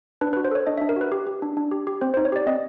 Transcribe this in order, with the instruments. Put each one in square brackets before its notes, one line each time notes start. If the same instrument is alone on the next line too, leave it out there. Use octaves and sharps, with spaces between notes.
[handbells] D4 B4
F#4 B4
C5
A4 C#5
D4 D#5
D4 E5
A#4
F#4 B4
G4
G4
D4
D4
G4
G4
C4 C5
D#4 C5
C#5
G4 D5
C4 D#5